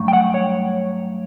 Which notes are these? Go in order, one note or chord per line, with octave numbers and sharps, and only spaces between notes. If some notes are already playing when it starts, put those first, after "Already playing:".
Already playing: G2 F#3 A3
G5
F#5
C#5